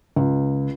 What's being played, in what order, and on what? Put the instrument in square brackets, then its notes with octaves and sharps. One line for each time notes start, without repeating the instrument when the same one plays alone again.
[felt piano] C#2